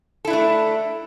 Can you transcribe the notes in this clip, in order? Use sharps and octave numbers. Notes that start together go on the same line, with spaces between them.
A3 D4 E4 A4